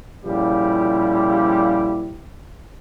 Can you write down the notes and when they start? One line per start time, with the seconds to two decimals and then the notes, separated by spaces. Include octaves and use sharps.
0.25 A#2 C#3 F3 G3 E4 G4